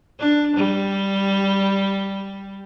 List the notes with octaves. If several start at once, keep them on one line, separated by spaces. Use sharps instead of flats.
D4
G3